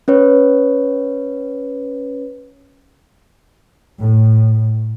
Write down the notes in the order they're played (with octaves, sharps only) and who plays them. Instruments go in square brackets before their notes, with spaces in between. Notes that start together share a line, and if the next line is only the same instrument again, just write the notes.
[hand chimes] C#4 B4 C#5
[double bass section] A2